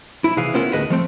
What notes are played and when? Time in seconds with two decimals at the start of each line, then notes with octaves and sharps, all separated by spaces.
0.24 E4
0.37 C3 E3 G#4 F5
0.54 A3 B3 C#4 E4 F4 A#4
0.73 D2 A2 G#4 B4 D#5 B5
0.90 F3 A3 C4